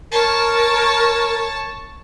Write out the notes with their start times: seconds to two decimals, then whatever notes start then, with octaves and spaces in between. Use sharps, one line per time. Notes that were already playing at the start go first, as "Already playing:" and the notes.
0.12 A#4 C#5 A5